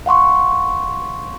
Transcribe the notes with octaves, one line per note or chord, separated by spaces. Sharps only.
F5 F#5 C6 C#6